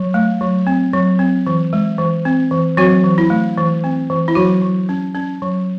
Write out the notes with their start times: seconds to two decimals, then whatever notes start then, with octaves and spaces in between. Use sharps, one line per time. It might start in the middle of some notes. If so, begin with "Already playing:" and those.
Already playing: F#3
0.14 A3
0.41 F#3
0.67 C4
0.93 F#3
1.19 C4
1.47 E3
1.73 G#3
1.98 E3
2.25 C4
2.51 E3
2.77 F#3 C4 F#4
3.04 E3
3.18 E4
3.30 A3
3.57 E3
3.84 C4
4.10 E3
4.28 E4
4.35 F#3 F#4
4.62 F#3
4.89 C#4
5.15 C#4
5.42 F#3